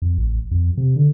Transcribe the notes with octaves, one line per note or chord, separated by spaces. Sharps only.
F2
A1
F2
C3
D3